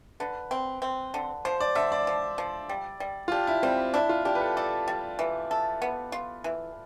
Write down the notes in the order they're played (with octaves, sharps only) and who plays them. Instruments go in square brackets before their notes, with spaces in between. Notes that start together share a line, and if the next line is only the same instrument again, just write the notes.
[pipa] D3 [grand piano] B4
[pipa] C4
C4
D3
[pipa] F3 [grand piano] C5
[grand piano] D5
[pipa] D3 [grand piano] E5
[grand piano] D5
[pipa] F3
F3
G3
G3
[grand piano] F4
[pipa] D4 [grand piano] G4
[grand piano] E4
[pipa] G3 [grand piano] C4
[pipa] D4 [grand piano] E4
[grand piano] F4
[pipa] D4 [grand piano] G4
[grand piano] B4
A4
[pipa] A4 [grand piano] D5
[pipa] G3
E3
A4
B3
F4
E3